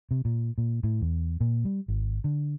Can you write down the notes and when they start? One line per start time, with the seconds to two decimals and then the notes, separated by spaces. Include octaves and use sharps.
0.11 C3
0.25 A#2
0.58 A#2
0.83 A2
1.01 E2
1.41 A#2
1.65 G3
1.88 G#1
2.24 D3